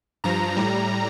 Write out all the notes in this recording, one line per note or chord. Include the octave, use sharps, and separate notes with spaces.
G2 F3 A#5
A2 G3